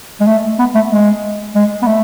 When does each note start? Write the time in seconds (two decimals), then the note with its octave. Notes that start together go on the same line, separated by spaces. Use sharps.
0.20 G#3
0.27 A3
0.59 B3
0.75 A3
0.91 G#3
1.55 G#3
1.82 B3
1.87 A3